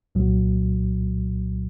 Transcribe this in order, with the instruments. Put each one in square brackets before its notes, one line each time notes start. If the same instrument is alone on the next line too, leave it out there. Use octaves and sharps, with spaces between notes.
[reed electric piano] C2 A#2 F#3